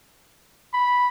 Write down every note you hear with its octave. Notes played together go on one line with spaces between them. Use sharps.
B5